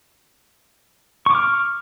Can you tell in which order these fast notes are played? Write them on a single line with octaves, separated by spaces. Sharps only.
C#6 D6 F6